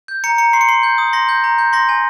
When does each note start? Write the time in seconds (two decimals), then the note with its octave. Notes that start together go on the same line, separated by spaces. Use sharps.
0.08 G6
0.24 A#5 C#7
0.38 A#5 C#7
0.53 C6 C7
0.61 C#7
0.68 C6 C7
0.83 G6
0.98 D#6
1.13 C6 A#6
1.29 G6
1.44 A#5
1.58 G6
1.73 C6 A#6
1.89 G#5